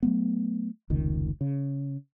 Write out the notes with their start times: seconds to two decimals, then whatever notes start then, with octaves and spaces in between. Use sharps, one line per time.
0.03 F#3 A3 B3
0.90 F1 C#2 D#3
1.41 C#3